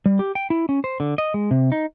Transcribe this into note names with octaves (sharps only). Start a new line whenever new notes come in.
G3
G4
G5
E4
C#4
C5
D3
D#5
G#3
C3
D#4